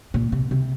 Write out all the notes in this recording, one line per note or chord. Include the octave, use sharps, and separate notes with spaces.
A#2
C3
C3